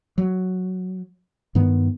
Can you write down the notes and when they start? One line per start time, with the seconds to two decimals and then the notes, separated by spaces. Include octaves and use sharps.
0.18 F#3
1.55 G2 D#3 B3